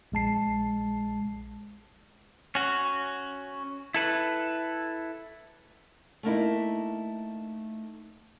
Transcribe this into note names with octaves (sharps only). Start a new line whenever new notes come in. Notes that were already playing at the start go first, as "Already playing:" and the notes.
A#1 G#3 A5 C7
C#4 F#4
E4 A4 B4
A3 A#3 D#4 E4